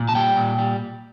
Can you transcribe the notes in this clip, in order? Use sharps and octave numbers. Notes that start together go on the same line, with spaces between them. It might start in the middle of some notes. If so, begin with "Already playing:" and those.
Already playing: A#2
A5
G3 G5
A#2
G3